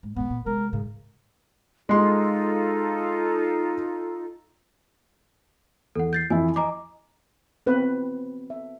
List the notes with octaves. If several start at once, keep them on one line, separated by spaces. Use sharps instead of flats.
G#2
G#2 C3 B3
A#2
C3 G#3 A#4
G#2 C#3 G#3
G#3 D#4 F4 A4 C6
E2 A4 F#5
G6 A6 C7
F2 E3 E4 G#5
D#5 G#5 A#5 D6
B3 C4 B4
E5